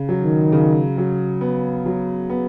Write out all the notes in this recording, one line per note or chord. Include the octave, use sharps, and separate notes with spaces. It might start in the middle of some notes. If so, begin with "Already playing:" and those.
Already playing: C#3
F#3
D#3
C#3
F#3
B3
F#3
B3